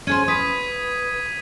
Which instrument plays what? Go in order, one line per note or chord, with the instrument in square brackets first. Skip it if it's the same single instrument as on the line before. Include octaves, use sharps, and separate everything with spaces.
[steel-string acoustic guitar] C#4 G#4 C5 [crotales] G#6 D#7
[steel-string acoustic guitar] B4 [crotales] D#6 B6 D#7